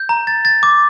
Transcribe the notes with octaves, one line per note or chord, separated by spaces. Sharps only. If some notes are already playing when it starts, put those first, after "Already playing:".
Already playing: G6
A#5
A6
A6
D6